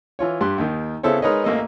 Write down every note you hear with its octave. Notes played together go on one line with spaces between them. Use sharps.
E3 F4 C#5
G2 G4 C6 F#6
D#2 D#3
C#3 B3 E4 A4 C5 C#5
G#3 D#4 A#4 B4 C#5 D#5
A1 A#3 A4 D#5